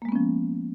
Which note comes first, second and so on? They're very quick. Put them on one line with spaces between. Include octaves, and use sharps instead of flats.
A#3 G#3 B3 C#4 F3